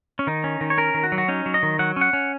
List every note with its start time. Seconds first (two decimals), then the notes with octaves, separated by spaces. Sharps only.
0.19 C#4
0.27 D#3 D#4
0.44 C#4
0.61 D#3
0.70 C#5
0.78 C#4 A#4
0.94 D#3
1.04 F#4
1.12 F#3
1.18 F#4
1.28 C#4 D#4
1.46 F#3
1.54 D#5
1.63 D#3
1.79 F#3 F#5
1.96 C#4 F#5
2.13 C#4